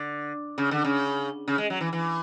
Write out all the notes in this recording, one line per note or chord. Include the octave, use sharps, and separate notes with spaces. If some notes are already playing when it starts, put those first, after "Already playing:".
Already playing: D3
C#3
D3
C#3
C#3
G#3
F#3
E3
E3